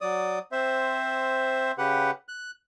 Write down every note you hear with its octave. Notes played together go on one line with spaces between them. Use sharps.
F#3 D5 D#6
C4 C5 E5
C#3 G4 B4 F#5
F#6